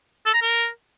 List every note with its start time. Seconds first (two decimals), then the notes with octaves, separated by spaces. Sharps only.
0.26 A4
0.34 A#5
0.42 A#4